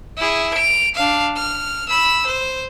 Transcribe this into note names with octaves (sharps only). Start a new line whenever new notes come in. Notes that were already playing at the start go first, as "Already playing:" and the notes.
E4 G#4
D7 F7
D4 F5
F6
B5 E6
C5